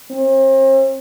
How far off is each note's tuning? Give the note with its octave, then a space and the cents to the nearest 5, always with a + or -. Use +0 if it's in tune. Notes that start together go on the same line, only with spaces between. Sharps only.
C4 +40